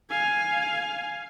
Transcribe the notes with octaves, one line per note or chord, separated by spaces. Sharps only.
F5 G#5